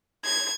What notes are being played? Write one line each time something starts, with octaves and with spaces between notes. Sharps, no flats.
G#6